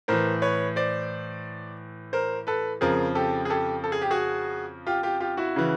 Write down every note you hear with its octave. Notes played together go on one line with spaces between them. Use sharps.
A2 E3 A#4 C5
B4 C#5
C5 D5
A#4 C5
A4 B4
F2 C#3 F3 G#4 A#4
G4 A4
G#4
G4 A4
A4
G#4
G4
F#4 G#4
F4 G4
F4 G4
F4 G4
E4 F#4
C#3 E3